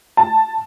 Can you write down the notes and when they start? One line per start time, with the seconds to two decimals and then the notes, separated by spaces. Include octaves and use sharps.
0.17 A5